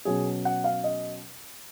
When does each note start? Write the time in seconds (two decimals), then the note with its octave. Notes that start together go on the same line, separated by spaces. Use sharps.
0.05 B2 F#3 C#4 G#4
0.45 F#5
0.64 F5
0.84 D#5